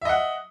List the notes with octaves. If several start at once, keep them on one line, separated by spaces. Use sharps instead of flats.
D#5 E5 F#5